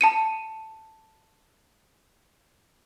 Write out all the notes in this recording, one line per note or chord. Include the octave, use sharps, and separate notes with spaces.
A5 C#7 D#7